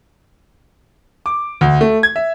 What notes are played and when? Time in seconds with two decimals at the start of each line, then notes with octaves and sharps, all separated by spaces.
1.26 D6
1.61 D2
1.81 A3
2.03 G#6
2.16 E5